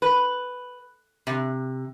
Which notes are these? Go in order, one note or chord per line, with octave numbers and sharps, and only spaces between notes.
B4
C3